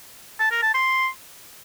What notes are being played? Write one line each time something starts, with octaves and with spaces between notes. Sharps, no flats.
A5
A#4
A5
C6